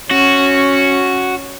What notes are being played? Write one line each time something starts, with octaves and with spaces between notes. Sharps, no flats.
C#4 F#4